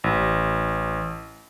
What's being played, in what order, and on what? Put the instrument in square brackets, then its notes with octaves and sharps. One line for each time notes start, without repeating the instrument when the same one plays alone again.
[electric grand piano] A1